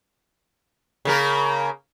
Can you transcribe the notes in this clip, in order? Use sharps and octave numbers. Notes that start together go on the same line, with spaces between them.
C#3 A#3 A#4